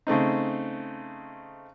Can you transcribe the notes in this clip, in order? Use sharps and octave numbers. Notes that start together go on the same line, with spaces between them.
C#3 A3 C4 D#4